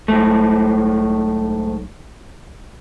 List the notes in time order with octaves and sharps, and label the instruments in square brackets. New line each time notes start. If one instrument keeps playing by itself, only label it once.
[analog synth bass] B1 [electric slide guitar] G#2 A3